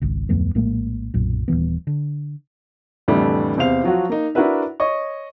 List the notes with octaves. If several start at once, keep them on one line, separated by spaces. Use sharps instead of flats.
G#1 C#2
D1 F2 A3 B3
A#1 A2 G#3 A#3
B1 F#2 A#2
D#1 F2 E3 B3
D3
F2 A2 D3 E3 G3 A3
E2 C3 C4 C5 F5 F7
F3 F#3 F4 F#4
A#3 D#4
D4 E4 F#4 A#4 B4 E5
C#5 D#5 C#6